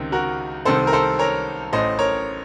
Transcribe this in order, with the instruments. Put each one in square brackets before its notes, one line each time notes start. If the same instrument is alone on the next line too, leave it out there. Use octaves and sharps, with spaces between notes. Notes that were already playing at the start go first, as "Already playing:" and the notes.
Already playing: [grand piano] C#2 C3 D#3
F#4 A#4
C2 C3 D#3 A4 C5
A#4
A4 C5
A#4 C#5
A1 A2 C5 D#5
A#4 C#5